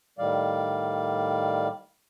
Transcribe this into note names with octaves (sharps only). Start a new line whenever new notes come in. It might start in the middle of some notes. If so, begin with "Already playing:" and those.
A2 D#3 G3 D5 F5